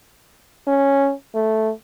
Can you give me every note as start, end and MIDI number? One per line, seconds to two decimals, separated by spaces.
0.68 1.13 61
1.35 1.71 57